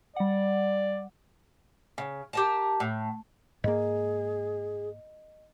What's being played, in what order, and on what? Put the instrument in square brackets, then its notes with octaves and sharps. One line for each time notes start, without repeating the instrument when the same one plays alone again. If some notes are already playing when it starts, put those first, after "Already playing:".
[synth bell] G3 F#5 [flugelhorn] D5
[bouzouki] C#3
G4 A#4 A5
A2
[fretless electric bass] G#2 A#3 [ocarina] G#4 [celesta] D#5